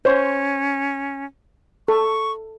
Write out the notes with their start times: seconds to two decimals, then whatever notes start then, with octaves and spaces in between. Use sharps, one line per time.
0.05 C#4 C5 C#5
1.88 A4 C#6